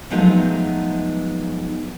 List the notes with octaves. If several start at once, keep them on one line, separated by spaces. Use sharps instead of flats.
F3 F#3 G#3 A3 B3 D#4